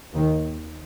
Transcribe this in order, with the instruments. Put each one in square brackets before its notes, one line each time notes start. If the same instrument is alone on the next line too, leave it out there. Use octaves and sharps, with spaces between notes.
[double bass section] D#2 D#3